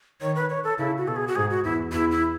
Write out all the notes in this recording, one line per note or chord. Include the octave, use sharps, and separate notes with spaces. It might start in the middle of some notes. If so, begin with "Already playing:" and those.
D#3 C#5
B4
C#5
A4
C#3 E4
F#4
B2 A4
G#4
F#4
G#2 G#4
F#4
E2 E4
E2 E4
E4